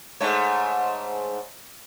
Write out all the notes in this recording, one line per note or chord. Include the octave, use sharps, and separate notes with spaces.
G#2 A3 C#5